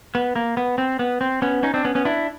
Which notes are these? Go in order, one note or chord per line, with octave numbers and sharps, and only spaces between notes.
B3
A#3
B3
C4
B3
C4
B3 C#4
C#4 D#4
C4 D4
B3 C#4
B3 C#4
D4 E4